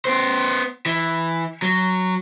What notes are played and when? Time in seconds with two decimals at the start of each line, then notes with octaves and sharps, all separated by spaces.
0.05 B3 C5
0.86 E3
1.62 F#3